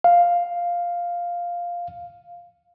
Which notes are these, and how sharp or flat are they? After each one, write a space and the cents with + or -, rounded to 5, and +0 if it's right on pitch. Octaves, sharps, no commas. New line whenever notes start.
F5 +0